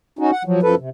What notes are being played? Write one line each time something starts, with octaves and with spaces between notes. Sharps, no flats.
C#4 D#4 F#4
F#5
F3 F#3
F#2 F3 A4 B4
C3